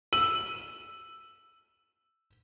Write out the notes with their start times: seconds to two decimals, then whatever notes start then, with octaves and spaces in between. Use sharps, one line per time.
0.13 E6 D#7 F#7